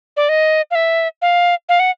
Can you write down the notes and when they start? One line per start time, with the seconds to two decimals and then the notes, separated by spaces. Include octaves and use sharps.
0.17 D5
0.29 D#5
0.71 F5
0.75 E5
1.22 F5
1.69 F5
1.80 F#5